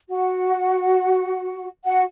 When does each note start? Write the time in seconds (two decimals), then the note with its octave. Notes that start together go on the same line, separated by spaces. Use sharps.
0.10 F#4 F#5
1.85 F#4 F#5